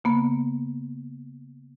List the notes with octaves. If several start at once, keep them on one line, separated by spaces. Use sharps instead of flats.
C#3 A#3 B3